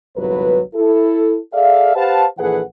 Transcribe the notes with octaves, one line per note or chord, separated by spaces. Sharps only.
G1 C2 G#2 F#3 B4
E4 A4
G#4 A4 D5 E5 F5
G4 B4 C5 F5 F#5 A5
A#1 E3 G#4 A4 B4 F#5